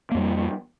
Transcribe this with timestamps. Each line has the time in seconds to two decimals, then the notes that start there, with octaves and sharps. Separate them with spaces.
0.11 A#3
0.15 F2
0.18 G3